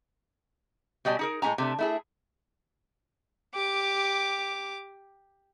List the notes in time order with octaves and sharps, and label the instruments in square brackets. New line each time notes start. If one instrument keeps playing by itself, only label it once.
[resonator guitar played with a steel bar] B2 G3 D#5 F#5 G#5
D#4 G#4 A#4
A2 G#3 C#4 G#5 A#5
C3 A3 D4
A3 E4 G#4
[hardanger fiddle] G4 D6